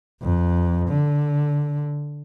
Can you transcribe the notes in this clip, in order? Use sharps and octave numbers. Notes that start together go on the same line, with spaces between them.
F2
D3